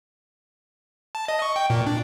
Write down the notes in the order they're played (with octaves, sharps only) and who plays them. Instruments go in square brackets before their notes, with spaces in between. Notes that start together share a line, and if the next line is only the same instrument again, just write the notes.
[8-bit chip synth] A5
D#5
C#6
G5
A#2
D4